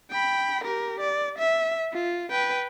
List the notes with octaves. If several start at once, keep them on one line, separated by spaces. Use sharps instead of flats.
G5 B5
G4 A#4
D5
E5
F4
B4 G5